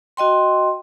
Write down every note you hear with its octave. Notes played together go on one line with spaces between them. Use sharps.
F#4 D#5 G5 C6